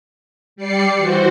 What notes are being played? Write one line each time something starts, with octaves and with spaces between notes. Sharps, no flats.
G3 D5 C7 C#7
E3 F#4 C5